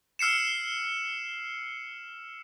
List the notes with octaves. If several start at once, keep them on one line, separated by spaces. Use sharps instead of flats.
E6 F6 C7 C#7 E7